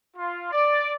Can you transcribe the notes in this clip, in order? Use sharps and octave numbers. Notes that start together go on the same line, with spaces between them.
F4
D5